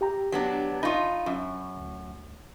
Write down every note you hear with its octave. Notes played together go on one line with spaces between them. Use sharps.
G4 G5 A#5
F#3 B3 D4
D#4 F4 B5 C#6
F#2
D2